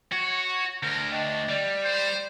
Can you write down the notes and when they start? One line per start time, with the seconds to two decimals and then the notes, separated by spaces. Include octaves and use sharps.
0.13 F#4 C#5
0.83 D2 A#4
1.12 D4 D#5 G5
1.49 G3 D5
1.84 C5